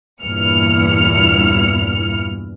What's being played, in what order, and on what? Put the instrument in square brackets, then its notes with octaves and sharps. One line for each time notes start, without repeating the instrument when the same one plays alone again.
[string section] E2 G2 A#2 E4 F6 C#7